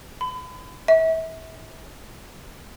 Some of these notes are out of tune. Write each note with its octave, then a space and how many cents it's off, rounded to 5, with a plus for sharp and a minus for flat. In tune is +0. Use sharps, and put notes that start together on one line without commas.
B5 +35
E5 -30